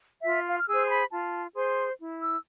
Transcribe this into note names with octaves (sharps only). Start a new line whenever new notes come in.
F4 E5
F5
F6
G#4 C5 E6
C6
B5
F4 A5
G#4 C5 C6
E4
E6